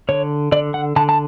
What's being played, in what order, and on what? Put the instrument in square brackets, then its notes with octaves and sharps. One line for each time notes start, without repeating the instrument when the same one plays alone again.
[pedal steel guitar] D3 C#5
D3 D5
F#5
D3 A5
A5